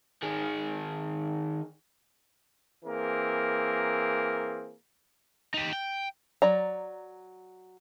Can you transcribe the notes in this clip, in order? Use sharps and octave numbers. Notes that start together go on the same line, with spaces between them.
D#3 G#4
E3 A#3 C4 G#4 A#4
D#4 G4
G5
F#3 D5 A#5